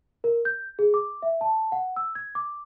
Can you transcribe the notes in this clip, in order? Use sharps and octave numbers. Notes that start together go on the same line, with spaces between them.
A#4
G6
G#4
D6
E5
A5
F#5
E6
G#6
D6